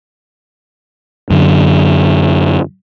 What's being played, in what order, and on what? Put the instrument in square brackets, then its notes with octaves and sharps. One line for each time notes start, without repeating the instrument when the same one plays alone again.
[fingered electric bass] F#2 D3